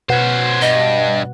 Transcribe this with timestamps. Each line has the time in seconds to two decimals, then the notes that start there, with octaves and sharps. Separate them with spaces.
0.09 B2 C#4 B4 C5 F#5
0.62 G2 D#5